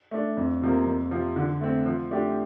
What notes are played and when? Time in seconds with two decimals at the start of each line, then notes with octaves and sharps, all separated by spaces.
0.11 A3 D4
0.37 F2
0.62 C3 F3 A#3
0.86 F2
1.11 C3 F3
1.36 D3
1.61 A3 C4
1.86 F3
2.11 A3 D4 G4